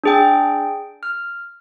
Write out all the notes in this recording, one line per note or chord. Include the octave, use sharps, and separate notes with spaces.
D4 G#4 G5
F6